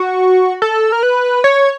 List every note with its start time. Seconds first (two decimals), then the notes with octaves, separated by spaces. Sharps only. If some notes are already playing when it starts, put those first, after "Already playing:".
Already playing: F#4
0.62 A4
0.92 A#4
1.03 B4
1.44 C#5